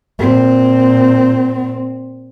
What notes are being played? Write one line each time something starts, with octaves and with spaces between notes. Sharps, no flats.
A#2 C4